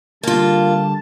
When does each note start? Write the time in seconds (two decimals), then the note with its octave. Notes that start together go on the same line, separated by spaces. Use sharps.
0.23 D3 G3 A#3 F4 A5